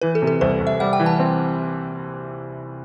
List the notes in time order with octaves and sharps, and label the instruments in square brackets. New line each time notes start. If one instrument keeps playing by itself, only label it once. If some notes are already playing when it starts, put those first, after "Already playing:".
[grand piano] E3 [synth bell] B4
[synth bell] A4
[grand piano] C3
[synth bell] A4
[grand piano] C2 [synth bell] C5
[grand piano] C2
[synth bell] E5
[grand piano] G3 [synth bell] F#5
[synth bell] G5
[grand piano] E3
[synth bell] A5
[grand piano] C4